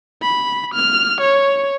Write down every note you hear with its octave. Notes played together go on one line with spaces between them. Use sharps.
B5
F6
C#5